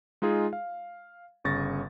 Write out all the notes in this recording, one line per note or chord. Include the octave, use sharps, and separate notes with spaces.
G#3 D#4 F4 G#4
F5
G1 C#3 C#6 A6 A#6